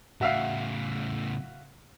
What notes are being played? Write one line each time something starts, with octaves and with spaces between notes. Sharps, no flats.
A2 C#3 F#4 E5 F5